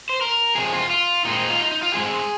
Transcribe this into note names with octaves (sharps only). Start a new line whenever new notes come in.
C5
A#4
F2 C3 G#3 C4 G#4
F4
F4
A#2 G#3 C4 D#4
F4
D#4
D#4
F4
G#2 F3 G#3 C4 G#4